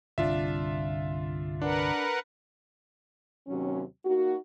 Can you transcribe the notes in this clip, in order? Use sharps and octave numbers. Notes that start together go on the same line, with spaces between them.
G1 C2 D4 F4 E5
D4 A#4 B4 F#5
D#2 C3 F#3 C#4
A#3 D#4 F#4